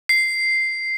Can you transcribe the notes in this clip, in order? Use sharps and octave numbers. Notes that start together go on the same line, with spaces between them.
C7